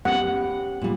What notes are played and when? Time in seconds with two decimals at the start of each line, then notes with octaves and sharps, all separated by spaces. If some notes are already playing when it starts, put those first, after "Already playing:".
0.05 B3 C#4 G4 F#5
0.81 A#2 G3